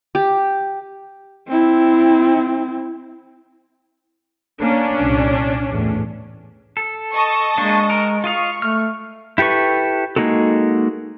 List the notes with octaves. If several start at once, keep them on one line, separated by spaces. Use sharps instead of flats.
G4
C4 E4
A#3 C#4 D4
C2 A#2
E2 A2
A4
D#5 A5 C#6
G#3 A#3 D4
A#4
F4 D#5 F5 C#6
A3 F6
E4 G4 A4 B4 C#6
G#3 A#3 D#4 F#4 A4